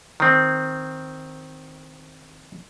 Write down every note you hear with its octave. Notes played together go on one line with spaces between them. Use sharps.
D#3 C4